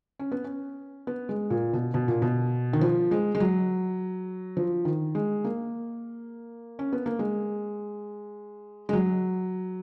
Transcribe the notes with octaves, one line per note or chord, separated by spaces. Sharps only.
C#4
B3
C#4
B3
G#3
A#2
B2
B2
A#2
B2
D#3
F3
G#3
G#3
F#3
F3
D#3
G#3
A#3
C#4
B3
A#3
G#3
G#3
F#3